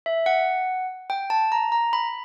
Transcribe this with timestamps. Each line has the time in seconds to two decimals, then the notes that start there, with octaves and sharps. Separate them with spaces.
0.06 E5
0.26 F#5
1.10 G5
1.30 A5
1.52 A#5
1.72 A#5
1.93 B5